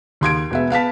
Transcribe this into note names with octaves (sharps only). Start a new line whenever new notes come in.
D#2 C6 G#6 D7
E1 B3 E5
B3 F5 A5 B6